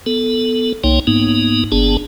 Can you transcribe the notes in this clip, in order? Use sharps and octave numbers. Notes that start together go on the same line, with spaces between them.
B3 A4
C2 A#3 D#4 C#5 G5
G#2 A#3 B3 D#4
G1 B3 D4 G#4 A5